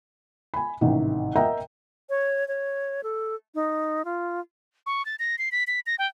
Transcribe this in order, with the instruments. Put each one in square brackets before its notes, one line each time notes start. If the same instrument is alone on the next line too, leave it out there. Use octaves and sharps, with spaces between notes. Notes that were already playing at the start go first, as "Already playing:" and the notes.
[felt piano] G#5 B5
A1 G#2 C3 D#3
A#4 D#5 E5 F#5 G5 A#5
[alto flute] C#5
C#5
A4
D#4
F4
[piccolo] C#6
A6
A#6
C7
B6
B6
A#6
G5